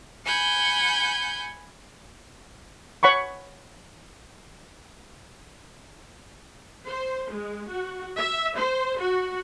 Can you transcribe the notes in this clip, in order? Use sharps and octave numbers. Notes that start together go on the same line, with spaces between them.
F#5 G#5 B5 G6
C#5 F#5 B5 C#6
C5
G#3
F#4
E5
C5
F#4